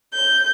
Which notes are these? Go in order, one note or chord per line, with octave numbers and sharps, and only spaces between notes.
G6